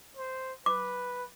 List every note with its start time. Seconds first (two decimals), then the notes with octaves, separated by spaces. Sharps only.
0.17 C5
0.66 B4 D6